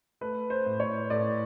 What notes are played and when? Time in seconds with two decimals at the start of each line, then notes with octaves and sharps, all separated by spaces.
0.21 A3 B4
0.50 C5
0.66 A2
0.80 C#5
1.10 A2 D5